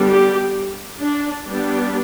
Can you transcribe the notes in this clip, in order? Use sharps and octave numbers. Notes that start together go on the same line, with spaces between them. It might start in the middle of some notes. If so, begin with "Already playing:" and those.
Already playing: D3 G3 B3 D4
G4
D4
G3 B3 D4